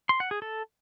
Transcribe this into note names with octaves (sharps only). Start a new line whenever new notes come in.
C6
F#5
G#4
A4